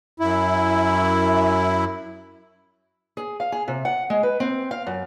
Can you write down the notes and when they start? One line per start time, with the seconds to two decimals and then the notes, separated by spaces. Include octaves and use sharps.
0.20 F#2 E4
3.17 G#4
3.40 F5
3.52 G#4
3.68 C3
3.85 F#5
4.10 G#3
4.23 B4
4.40 C4
4.71 F5
4.87 F#2